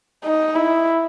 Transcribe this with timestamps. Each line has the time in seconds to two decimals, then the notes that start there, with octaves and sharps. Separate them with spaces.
0.24 D#4
0.56 E4